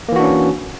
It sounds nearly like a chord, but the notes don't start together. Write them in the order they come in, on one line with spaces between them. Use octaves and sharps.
A#3 E3 F#4 D4 C#4